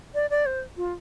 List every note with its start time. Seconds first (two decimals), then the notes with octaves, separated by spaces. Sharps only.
0.14 D5
0.30 D5
0.46 C5
0.77 F4